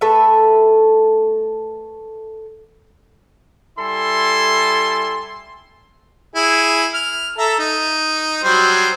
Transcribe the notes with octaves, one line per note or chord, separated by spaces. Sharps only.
A3 A4 B4 E5
G3 E4 A4 G#5 C6
E4 G#4
F6
A4 E5 A#5
D#4
F#3 G3 C5